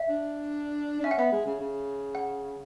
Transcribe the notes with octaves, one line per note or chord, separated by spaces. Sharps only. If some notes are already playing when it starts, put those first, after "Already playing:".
Already playing: E5
D4
D4
C#4 E5
F#5
B3 E5
G#3
C#3
C#3
F#5